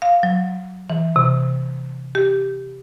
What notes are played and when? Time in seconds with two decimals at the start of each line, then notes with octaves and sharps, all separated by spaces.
0.02 F5
0.23 F#3
0.90 E3
1.16 C3
2.15 G4